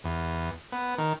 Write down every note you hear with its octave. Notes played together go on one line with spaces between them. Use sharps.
E2
B3
D#3